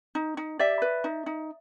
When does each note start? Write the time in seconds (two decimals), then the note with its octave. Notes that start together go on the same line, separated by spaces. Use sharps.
0.15 D#4
0.37 D#4
0.59 G4 D5 E5
0.82 B4
1.04 D#4
1.26 D#4